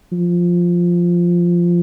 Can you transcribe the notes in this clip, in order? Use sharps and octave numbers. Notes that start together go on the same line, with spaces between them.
F3